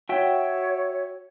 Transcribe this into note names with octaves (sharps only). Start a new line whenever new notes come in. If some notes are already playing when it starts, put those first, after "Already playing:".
F#4 C#5 E5 G5